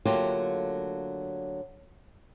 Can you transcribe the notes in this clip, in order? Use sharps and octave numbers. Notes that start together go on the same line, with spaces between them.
D3 F#3 A3 A#3 F4 G4